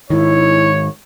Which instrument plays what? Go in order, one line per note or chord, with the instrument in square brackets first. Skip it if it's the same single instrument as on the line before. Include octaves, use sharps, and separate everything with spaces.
[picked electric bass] G#2 D#3 [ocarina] E4 [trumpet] C#5